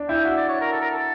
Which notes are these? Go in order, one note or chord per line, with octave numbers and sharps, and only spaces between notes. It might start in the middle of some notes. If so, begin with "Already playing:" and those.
Already playing: D4
E4 G5
F#4 E5
D5
C#5
A#4
A4
A#4
A4